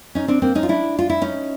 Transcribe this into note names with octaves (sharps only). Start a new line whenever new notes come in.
C#4 D#4
C4 D4
A#3 C4
C#4 D#4
F4
D4 E4
F4
E4
C#4 D#4